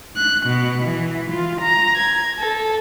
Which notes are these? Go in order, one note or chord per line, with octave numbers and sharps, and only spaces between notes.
F#6
B2
E3
F4
A#5
G#6
A4